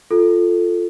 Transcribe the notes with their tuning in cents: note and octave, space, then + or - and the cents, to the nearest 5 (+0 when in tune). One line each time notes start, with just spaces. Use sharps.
F4 +0 A4 +0